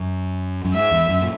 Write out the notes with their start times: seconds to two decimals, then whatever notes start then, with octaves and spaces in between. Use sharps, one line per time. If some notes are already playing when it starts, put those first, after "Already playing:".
Already playing: F#2
0.65 F#2
0.73 G#2 E5
0.91 E2
1.09 F#2
1.22 A#2